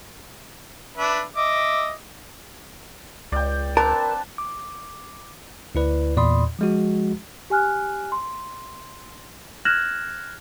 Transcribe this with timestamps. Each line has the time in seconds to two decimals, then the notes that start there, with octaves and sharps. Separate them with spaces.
0.98 D4 B4 E5
1.36 D#5 E5 D6
3.32 C#2 D5 G5
3.77 C4 D4 A#4 B4 A5
4.38 D6
5.75 D2 E4 B4 D5
6.17 E2 A#2 D5 B5 C6 D#6
6.59 F3 G#3 F#4
7.50 G4 G#5 F6 F#6
8.12 C6
9.65 F6 F#6 G#6 A#6 E7 F#7